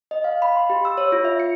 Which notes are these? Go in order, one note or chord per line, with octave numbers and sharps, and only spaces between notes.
D#5
F5
B5
C6
G4
E6
C#5
F4
E5
C#7